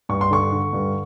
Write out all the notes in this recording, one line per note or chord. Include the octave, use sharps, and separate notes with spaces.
G2 C#6
C6
D3 C#6
D3
G2